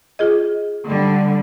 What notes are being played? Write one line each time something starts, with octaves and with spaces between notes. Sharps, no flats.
F4 G#4 D#5
D3 G3